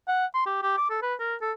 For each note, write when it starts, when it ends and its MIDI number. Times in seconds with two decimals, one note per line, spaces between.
0.08 0.26 78
0.34 0.43 84
0.46 0.58 67
0.63 0.73 67
0.77 0.89 86
0.90 1.00 69
1.02 1.15 71
1.20 1.35 70
1.41 1.52 69